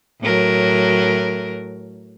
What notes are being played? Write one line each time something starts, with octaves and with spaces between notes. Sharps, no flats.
A2 F#3 A#4